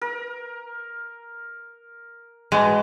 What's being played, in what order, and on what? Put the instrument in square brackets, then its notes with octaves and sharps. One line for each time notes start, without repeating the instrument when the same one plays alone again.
[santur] A#4
[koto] G#3 [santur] F#4 B4 A5